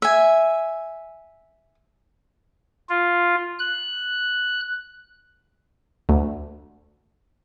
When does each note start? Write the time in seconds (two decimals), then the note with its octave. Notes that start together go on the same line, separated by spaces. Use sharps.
0.02 E5 G#5
2.90 F4
3.59 F#6
6.09 D2